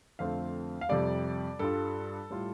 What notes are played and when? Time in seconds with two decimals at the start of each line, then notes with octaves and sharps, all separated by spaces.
0.19 F2 D3 A3 C4 F4 F5
0.81 F5
0.89 F2 C3 G3 D5
1.59 G2 G3 F4 A4
2.30 A2 G3 F4